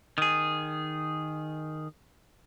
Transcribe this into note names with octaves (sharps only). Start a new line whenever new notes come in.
D#3 G#4